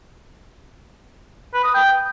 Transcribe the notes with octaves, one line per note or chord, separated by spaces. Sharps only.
B4
D#6
G5